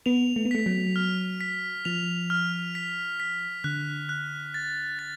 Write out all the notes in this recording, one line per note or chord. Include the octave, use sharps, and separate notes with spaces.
B3 F7
A3
B3
A3 B6
F#3
F6
B6
F3 F7
F6
B6
B6
D3 F#6
F#6
A6
A6